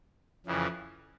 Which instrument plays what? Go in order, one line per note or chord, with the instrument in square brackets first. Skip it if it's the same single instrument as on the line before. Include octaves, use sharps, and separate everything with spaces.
[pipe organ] F2 C#3 E3